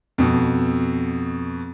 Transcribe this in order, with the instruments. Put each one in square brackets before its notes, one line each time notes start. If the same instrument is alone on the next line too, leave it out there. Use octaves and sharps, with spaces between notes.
[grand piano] F2 B2